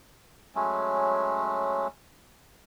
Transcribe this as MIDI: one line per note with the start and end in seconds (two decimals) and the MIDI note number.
0.55 1.87 54
0.55 1.87 56
0.55 1.87 57
0.55 1.87 61